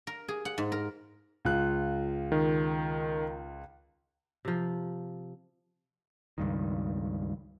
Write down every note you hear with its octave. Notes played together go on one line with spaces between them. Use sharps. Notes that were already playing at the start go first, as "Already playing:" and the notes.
A#4
G#4
F#5
G#2
A#4
C#2 F4 F#6
D#3
C3 F3
C#2 G2 D#3